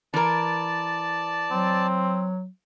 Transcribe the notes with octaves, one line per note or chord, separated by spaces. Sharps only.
E3 A#4 D5 A5
F#3 C4